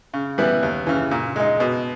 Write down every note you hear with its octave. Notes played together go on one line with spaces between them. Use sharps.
C#3
E3 G3 B3 E4
D#2
C#3 E3
A#2
G#3 D#4
B2